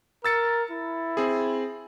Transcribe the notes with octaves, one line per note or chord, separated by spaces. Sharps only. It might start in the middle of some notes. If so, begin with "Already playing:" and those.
A#4 E6 A6 C#7
E4
C4 G#4